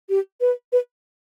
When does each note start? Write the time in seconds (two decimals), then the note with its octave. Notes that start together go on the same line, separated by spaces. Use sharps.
0.09 G4
0.41 B4
0.72 B4